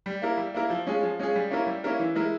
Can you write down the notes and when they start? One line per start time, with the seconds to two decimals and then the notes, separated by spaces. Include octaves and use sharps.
0.06 G3
0.22 A#3 E4 A#4
0.37 G3
0.54 A#3 E4 A#4
0.70 F3
0.87 G#3 C#4 F4 G#4
1.03 F3
1.19 G#3 C#4 F4 G#4
1.36 G3
1.51 A#3 C#4 E4 A#4
1.67 G3
1.84 A#3 C#4 E4 A#4
1.99 E3
2.15 G#3 E4 A#4